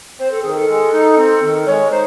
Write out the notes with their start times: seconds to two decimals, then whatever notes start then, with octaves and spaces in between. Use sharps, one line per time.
0.19 C4 C5
0.31 A4
0.42 D#3 G#4
0.55 A4
0.68 G#3
0.93 D#4
1.17 C4
1.42 D#3
1.66 G#3 C#5
1.91 D#4 C5